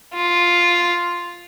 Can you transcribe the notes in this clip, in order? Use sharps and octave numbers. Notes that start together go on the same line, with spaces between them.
F4